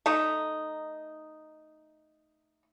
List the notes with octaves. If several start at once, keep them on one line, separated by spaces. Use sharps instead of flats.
A3 D#4